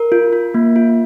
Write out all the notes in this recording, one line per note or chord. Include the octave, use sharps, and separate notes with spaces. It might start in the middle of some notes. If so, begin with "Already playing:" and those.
Already playing: A#4
F4
F4
A#3
F4